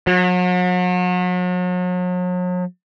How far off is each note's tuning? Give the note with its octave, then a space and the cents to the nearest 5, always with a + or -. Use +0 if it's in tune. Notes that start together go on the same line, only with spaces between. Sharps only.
F#3 -40